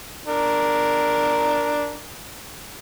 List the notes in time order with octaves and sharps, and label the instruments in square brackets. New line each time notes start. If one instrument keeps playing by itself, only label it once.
[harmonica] D4 A#4